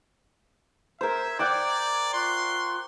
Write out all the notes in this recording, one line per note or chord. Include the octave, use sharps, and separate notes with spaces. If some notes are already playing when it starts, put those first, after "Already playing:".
A#4 C5 E5 G#6
D5 F#5 G5 D6
F4 C6 C#6 F#6